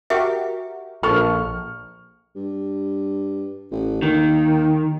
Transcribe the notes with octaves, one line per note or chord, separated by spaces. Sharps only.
F#4 G4 A#4 E5
A#1 A4 C#6 F6
G2
A1
D#2 D#3